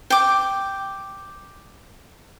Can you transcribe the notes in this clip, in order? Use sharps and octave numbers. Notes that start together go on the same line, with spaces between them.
G5 D6